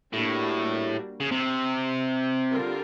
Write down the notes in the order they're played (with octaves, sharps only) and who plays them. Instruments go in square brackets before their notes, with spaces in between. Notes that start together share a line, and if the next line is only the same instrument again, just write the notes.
[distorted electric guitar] A2 [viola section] G3 A#3 D4 F#4
[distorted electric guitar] C#3
C3
[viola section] D3 G3 C4 F4 A#4